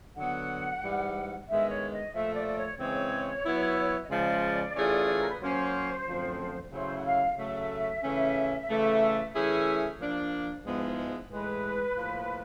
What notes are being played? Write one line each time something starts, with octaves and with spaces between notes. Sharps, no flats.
D3 F#3 B3 F#5
G#2 E3 G3
G2 D#3 G#3 B3 E5
C#5
D#5
A#2 F3 A3 E5
D5
D5
C#5
C#3 E3 G#3 C4 C#5
F#3 B3 E4
D#5
C#3 F3 G#3 D5
E3 A3 C#4 F4 G#4
A#4
B4
F#3 A#3 C#4 C5
F#2 D3 F3 A3 C4
C#3 F#3 A3 C#4 E4 C5
F#5
F5
C#3 F#3 A3 E5
C#3 E3 A3 C#4
C#3 E3 A3
E3 A3 C#4 E4 G#4
F3 A#3 D4
G#2 F3 G#3 B3 E4
A2 E3 G#3 B4
A2 F3 A#3